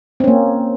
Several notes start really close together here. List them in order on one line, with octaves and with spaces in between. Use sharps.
C4 C#4 A#3